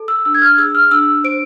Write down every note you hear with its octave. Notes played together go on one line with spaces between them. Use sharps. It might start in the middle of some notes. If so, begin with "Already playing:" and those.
Already playing: A4
E6
D4 E6
G#6
F6
G#4 E6
F6
D4 E6
C5 D7